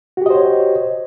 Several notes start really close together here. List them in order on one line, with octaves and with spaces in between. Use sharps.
F#4 G4 D#5 C5 C#5